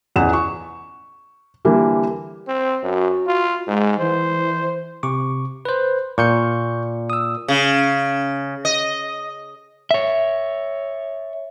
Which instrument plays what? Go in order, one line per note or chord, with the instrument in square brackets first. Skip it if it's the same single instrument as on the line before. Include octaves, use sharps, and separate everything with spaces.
[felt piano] A1 E2 F#5 E7
C#6
D3 E3 G3 A#3
[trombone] C4
[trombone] F#2 [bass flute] F#4
[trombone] F4
[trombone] G#2 [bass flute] G#3
[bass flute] E3 [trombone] C5
[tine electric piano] C3 C#6 D6
B4 C5
[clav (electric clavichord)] A#2 [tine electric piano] C#6 G6 C#7
[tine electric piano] D#6 E6
[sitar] C#3
D#5
[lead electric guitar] C#5 E5